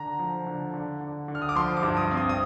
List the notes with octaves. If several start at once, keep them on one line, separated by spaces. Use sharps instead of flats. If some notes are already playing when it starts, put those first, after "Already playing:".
Already playing: D3 A#5
F3
D3
D3
D3
D3
F6
D#6
D6
F3 C6
D6
G2
D#6
C4
D#6
D#6